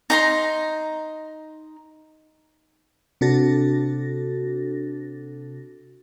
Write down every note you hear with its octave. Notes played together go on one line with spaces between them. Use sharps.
D#4 A#5 C6
C3 D4 F#4 A4 A6 A#6